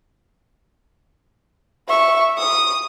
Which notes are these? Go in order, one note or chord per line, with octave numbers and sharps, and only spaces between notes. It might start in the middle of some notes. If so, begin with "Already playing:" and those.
E5 C#6
D#6